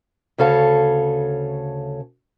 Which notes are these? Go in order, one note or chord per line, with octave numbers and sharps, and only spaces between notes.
D2 C#3 C#4 A4 F5